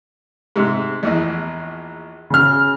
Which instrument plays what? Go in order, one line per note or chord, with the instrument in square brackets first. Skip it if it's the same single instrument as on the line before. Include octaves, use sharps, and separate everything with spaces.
[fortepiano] G#2 C3
A#1 E2 D#5
[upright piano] C#3 F6